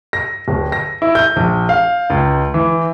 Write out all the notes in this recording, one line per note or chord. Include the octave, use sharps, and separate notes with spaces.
A#6
D1
A#6
E4
G6
A#1
F5
C#2
E3